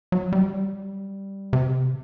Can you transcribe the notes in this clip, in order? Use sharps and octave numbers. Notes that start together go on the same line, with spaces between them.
F#3
G3
C3